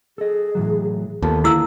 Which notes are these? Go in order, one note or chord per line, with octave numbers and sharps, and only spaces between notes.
G#4 A4 D#5
A2 E3 F#3
D#2 B3 F4 A4 A5
D3 A#3 E4 G#4 E6